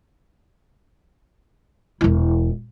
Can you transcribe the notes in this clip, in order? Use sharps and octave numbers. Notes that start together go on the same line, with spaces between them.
E1 E4